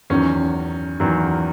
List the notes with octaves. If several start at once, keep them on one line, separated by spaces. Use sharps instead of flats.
E2 D#3 F#3 C#4
E2 D#3 F#3